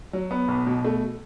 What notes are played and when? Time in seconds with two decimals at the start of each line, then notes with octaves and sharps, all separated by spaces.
0.13 F#3
0.31 B3
0.48 B1
0.67 B2
0.85 A3